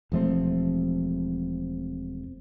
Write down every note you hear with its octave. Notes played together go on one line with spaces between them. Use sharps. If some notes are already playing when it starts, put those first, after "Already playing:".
E1 F3 A3 C4